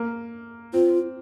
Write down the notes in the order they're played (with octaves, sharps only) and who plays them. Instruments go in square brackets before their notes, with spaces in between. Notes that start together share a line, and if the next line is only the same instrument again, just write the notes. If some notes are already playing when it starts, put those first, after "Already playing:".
Already playing: [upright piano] A#3
[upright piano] C4 [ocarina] F4